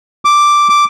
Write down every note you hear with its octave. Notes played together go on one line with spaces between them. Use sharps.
D6
D6